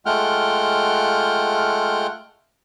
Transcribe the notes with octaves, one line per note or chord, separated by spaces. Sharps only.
G#3 A3 F4 F#5 G5 F6